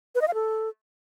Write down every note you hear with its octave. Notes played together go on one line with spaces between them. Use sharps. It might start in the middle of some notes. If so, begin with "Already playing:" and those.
B4
D#5
F5
A4